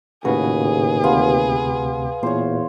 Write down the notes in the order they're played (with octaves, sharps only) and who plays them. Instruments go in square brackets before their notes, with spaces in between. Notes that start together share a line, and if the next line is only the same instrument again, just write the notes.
[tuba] D#2 [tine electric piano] A2 C#3 F#4 [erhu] G#4 [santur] B4
[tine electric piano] D2 C3 [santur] B3 F4
[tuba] E2 [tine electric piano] A#2 [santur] C5 C#5